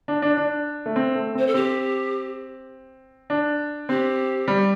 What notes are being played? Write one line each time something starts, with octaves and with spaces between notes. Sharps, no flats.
D4
D4
D4
A3
C4
A3
C4 C5
A4
C4 G4
D4
C4 G4
G3